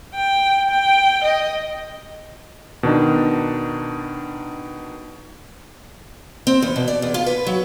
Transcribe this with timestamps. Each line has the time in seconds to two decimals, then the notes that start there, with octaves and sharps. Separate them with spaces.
0.15 G5
0.69 G5
1.23 D#5
2.83 B2 D#3 D4 D#4
6.47 C4
6.62 E2
6.76 B2
6.88 D5
7.02 E2
7.14 F4
7.26 B4
7.47 F#3